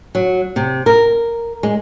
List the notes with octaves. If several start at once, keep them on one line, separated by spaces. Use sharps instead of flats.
F#3
C3
A#4
G#3